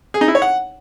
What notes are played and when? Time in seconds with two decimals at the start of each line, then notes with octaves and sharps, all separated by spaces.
0.14 G#4
0.21 D#4
0.28 E4
0.35 C#5
0.42 F#5